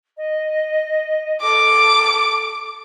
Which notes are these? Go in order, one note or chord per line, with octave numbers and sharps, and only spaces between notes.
D#5
A4 D6